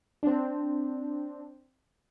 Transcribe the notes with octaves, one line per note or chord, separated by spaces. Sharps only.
C4 D4